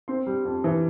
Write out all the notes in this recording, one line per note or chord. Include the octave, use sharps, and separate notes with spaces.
C4 C6
G3
F2
E3